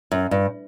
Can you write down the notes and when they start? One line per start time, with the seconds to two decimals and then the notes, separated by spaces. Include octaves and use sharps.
0.12 F#2
0.31 G2